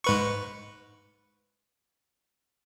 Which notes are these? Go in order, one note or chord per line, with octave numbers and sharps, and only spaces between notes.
G#2 B4 C#6